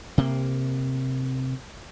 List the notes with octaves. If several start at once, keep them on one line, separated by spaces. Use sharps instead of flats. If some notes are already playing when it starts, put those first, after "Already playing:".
C3 A#3